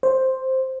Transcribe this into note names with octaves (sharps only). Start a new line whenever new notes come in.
C5